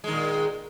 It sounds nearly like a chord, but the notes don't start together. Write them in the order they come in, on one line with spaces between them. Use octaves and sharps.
G#3 D#3 A#2